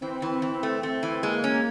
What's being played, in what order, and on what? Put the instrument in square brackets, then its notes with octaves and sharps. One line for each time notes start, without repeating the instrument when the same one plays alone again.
[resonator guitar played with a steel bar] E3 [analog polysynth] C4
[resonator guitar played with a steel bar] E3
E3
A3
A3
E3
[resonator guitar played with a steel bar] G#3 [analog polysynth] A#3
[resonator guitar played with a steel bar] C#4
[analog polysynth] A#3